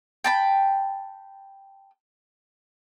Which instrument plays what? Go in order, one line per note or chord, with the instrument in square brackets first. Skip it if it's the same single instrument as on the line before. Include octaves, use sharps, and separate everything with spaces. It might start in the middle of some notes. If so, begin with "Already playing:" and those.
[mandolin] G5 A5 B5